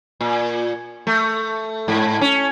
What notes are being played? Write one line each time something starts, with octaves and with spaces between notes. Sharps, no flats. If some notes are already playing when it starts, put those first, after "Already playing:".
A#2
A3
G#2
C#4